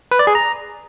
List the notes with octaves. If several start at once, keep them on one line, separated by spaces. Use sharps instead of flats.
B4
D5
G#4
A#5